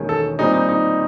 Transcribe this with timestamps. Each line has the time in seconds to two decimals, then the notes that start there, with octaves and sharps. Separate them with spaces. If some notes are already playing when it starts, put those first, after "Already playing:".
Already playing: E1 D#2 D#3 G#3 C#4
0.09 A4
0.39 A#2 G3 C4 D#4
0.54 D#4
0.69 D#4